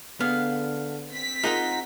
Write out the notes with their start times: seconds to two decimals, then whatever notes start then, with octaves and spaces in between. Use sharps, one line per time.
0.20 D3 B3 G#4 F5
1.10 C4 B6
1.43 D#4 F4 G#4 A#4 F#5 A#5